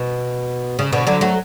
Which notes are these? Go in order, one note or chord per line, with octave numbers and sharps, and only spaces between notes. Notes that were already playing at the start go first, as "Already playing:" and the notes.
Already playing: B2
C#3
B2 D3
D3 F#3
F#3 A3